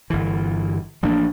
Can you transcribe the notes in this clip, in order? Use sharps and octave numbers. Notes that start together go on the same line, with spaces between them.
G1 E3
A1 F3 A#3 D4